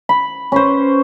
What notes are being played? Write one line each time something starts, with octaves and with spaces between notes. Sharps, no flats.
B5
C#4 B4 C5